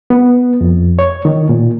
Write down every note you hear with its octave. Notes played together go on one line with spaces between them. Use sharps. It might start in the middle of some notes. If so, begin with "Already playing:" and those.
B3
F2
C#5
D#3
A#2